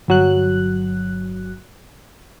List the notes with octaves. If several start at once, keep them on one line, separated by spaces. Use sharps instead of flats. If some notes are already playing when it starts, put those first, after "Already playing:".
G1 F#3 F#6